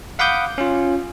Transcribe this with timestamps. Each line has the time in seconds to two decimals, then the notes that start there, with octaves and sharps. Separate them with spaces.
0.19 F5 F#5 B5 D6 D#6 G6
0.58 C#4 F4